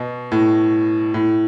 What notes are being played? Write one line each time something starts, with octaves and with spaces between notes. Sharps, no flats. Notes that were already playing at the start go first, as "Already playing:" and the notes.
Already playing: B2
A2
A2